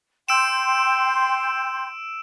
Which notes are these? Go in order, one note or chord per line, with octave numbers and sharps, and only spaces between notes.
G5 C6 E6 G6 D7 E7